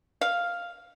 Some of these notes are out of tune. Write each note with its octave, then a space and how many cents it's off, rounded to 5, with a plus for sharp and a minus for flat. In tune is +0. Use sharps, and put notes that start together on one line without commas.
F5 +0